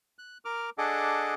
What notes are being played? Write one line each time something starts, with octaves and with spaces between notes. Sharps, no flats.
F#6
A#4 D6 F6
D4 G#4 A4 D#5 F#5 D6